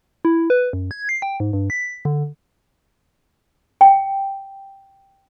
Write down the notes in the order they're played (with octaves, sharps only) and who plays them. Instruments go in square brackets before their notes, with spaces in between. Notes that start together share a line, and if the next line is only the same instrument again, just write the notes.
[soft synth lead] E4
B4
F#2
G#6
C7
G5
G#2
G2
B6
D3
[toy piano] G5